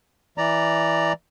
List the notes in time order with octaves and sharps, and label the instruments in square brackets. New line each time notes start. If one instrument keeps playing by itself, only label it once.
[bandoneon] E3 D5 A#5